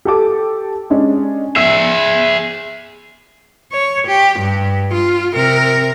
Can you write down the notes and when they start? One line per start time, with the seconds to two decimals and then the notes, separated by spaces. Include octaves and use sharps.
0.05 G4 A4 D6
0.90 G#3 C#4 D4
1.56 G#4 E5 E6
3.72 C#5
4.07 G4
4.39 G2
4.94 F4
5.34 C3 A#4